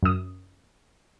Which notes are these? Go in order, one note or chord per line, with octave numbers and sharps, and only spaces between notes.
F#2 D#6